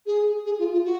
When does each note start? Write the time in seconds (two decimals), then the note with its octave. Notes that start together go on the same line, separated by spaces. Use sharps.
0.06 G#4
0.45 G#4
0.58 F4
0.72 F4
0.84 F#4